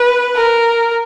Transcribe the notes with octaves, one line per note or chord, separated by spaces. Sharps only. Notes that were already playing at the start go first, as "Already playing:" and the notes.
Already playing: B4
A#4